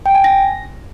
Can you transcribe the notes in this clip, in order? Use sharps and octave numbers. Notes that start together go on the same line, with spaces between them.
G5
G#5
A#6